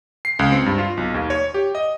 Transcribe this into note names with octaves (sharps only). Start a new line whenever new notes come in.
C7
C#2
C4
G2
F4
B1
D#2
C#5
G4
D#5